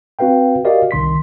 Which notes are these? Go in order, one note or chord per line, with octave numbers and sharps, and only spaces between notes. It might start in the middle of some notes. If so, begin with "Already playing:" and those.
C4 F#4 B4 F5 G5
F#4 G4 A#4 D5 D#5 F5
C2 D#3 C6 B6